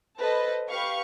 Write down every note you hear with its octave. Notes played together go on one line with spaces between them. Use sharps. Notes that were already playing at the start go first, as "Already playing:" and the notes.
A4 B4 C5 D#5 A5
G4 B4 F5 C#6